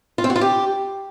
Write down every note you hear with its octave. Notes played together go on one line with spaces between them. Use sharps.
F4
C4
F#4
F4
G4